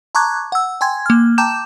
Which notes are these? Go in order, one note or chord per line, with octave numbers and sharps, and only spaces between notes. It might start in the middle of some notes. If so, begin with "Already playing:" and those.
A5 A#5 C#6 D6 F#6 G#6
F#5 E6
G5 G#5 C6 G#6
A#3 F6
G5 A5 A#5 D6 G6 E7